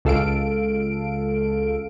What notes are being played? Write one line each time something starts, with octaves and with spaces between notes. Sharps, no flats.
C#2 A4 F5 D7